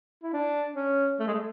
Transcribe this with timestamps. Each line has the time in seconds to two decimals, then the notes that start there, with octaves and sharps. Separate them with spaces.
0.23 E4
0.33 D4
0.76 C#4
1.19 A3
1.27 G#3
1.34 A3